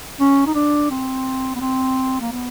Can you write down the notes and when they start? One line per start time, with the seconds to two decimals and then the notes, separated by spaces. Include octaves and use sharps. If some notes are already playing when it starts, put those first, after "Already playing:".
0.20 C#4
0.46 D#4
0.55 D4
0.91 C4
1.56 B3
1.61 C4
2.20 A#3
2.32 B3